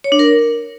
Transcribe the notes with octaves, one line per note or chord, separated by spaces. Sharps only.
C#5
D4
A#4